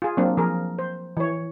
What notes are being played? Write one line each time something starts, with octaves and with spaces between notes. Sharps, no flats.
F4 G#4
F#3 A#3 C4 D4
F3 G#4 A#4
C5
E3 C#5